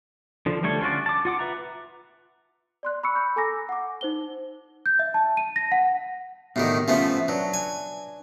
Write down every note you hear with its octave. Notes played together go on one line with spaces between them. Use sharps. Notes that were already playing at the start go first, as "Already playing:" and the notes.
D3 F3
D3 G3 A3 C#5
C#4 F4 F#4 D5
A5 D6
F4 F#5 D6
B4 E5 F#5 A#5
D5 C6 F#6
B5 C#6 E6 C#7
B5 G6
A4 G#5 A#5 D6 E6 A#6
F#5 D6
D#4 C5 G7
G6
E5
A5
D#7
A#6
F#5
A2 D3 D#3 B3 F#4 G4
F3 A3 B3 C#4 F4 E5
F#3 D4 B4
G#5